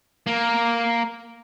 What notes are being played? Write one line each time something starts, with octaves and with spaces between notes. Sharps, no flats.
A#3